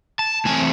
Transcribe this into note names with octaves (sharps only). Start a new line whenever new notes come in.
A5
A2 E3 A3 C4 G#5